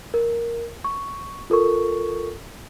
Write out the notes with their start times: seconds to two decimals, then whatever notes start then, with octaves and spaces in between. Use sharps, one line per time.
0.14 A#4
0.84 C#6
1.50 F4 A4 A#4 C#6